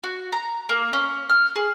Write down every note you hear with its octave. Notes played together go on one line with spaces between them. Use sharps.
F#4
A#5
A#3
C#4
F6
G#4